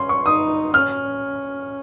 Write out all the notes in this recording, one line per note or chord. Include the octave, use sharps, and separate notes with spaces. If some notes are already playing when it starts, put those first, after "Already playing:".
Already playing: C#4 C6
C#6
D#4 D#6
C#4 F6